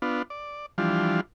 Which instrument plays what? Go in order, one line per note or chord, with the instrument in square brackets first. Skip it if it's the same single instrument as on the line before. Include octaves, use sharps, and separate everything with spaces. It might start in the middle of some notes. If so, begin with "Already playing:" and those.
[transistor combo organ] B3 D4 F4
D5
E3 F3 G3 D4 F4